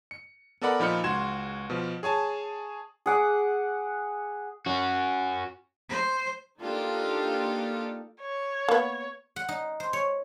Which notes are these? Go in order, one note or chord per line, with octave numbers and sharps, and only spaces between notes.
C#7
B3 A4 A#4 D5 F#5 B5
A#2 F3 D#4 B5 F6 C#7
C#2 F#4 C6 G#6 E7
B2 F3
G#4 C#5 G#5 A5
G#4 F#5 D6
C#4 F#4
C5
A#3 D4 D#4 F4 G4 A4
C#5
A#3 B3
F#5
D#4
C5
C#5